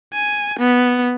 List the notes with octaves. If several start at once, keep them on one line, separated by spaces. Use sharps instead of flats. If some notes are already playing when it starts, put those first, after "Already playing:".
G#5
B3